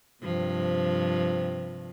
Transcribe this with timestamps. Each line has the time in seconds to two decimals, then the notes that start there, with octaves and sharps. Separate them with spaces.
0.23 G2 C3 F3